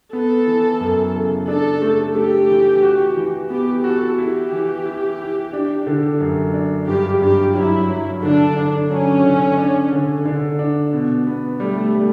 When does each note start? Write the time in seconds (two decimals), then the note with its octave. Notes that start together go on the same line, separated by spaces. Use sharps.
0.13 B3 A4
0.47 E3
0.80 F#2
1.14 C#3
1.48 D4 A4
1.82 A3
2.15 A3 G4
2.50 E3
2.82 F#4
3.17 E3
3.50 B3 G4
3.84 F#4 A4
4.18 E4 G4
4.52 E3
4.85 E4
5.19 E4
5.53 D4
5.87 D3
6.21 F#2
6.54 D4
6.88 G2 G4
7.21 G2 G4
7.55 F#3 E4
7.89 F#3
8.22 D3 D4
8.57 D3
8.90 F#3 C#4
9.24 D3
9.57 D4
9.92 D3
10.25 D3
10.59 D4
10.93 B2
11.27 B3
11.60 G3 A3
11.94 G3